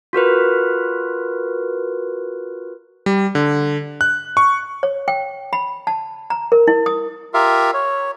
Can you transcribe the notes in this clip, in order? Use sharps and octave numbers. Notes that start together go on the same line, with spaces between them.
F4 F#4 A#4 B4
G3
D3
F#6
C#6
C#5
G5
B5
A5
A#5
A#4
E4
D#6
F4 G4 A#4 E5 F5
C#5